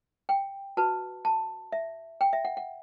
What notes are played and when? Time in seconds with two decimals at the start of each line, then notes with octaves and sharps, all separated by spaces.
0.29 G5
0.77 F#4 B4 A5
1.25 A5
1.72 E5
2.21 G5
2.33 E5
2.45 F#5
2.57 F#5